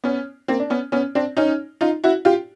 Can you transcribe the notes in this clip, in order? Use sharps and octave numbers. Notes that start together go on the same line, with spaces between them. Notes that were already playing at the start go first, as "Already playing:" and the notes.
B3 C#4
A#3 C4
D4
B3 C#4
B3 C#4
C4 D4
C#4 D#4
D#4 F4
E4 F#4
F4 G4